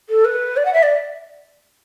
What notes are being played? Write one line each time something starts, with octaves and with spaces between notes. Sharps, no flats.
A4
B4
D5
F#5
E5
D5